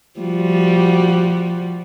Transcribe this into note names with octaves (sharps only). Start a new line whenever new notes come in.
F3 G3 F#4